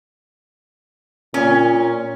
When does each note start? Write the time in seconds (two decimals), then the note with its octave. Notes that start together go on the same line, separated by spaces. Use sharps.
1.34 A#2 C#4